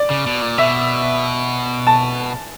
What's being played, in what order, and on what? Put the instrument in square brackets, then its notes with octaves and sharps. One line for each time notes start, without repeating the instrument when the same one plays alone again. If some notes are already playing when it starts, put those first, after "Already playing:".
Already playing: [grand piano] D5
[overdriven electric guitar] C#3
B2
A#2
[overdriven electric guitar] B2 [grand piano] E5
[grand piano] A5